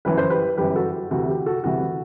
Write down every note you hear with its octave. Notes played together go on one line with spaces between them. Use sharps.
G1 F#2 E3 B4
C5
G4 B4
G1 F#2 E3 G4 B4
F#4 A4
D2 C3 E3 F#4
G4
F#4 A4
D2 C3 E3 F#4